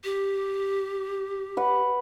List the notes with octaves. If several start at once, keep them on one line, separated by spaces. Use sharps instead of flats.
G4
B4 F#5